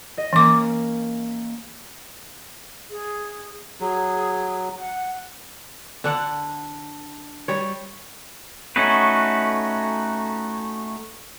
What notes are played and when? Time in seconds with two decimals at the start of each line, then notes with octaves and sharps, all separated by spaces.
0.18 D#5
0.33 E3 A#3 C#4 D6
2.91 G#4
3.80 F#3 G#4
4.79 F#5
6.04 D3 D4 F#5
7.48 G3 C#5
8.76 A3 C#4 D#4 F#4 B4